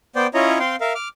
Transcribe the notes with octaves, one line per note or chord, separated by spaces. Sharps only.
B3 C5 D5 G5
C#4 E4 F4 C#5 D#5 A#5
C4 F5 G5 C6
A#4 E5 F5
D6 F6